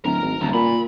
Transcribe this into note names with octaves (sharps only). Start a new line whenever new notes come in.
D1 A#4 A#5
G#1
D#1 D2
A#2 B5